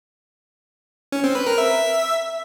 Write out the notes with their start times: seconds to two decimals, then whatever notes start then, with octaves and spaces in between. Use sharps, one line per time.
1.12 C#4
1.24 C4
1.35 B4
1.47 A#4
1.58 E5